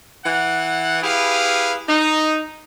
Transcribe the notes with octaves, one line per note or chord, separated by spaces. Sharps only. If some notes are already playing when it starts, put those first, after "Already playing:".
E3 F#5
E4 G4 G#4 B4 F5
D#4